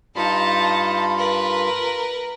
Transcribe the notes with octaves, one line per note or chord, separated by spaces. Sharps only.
G2 D#4 F4 A5 B5
A#4 B4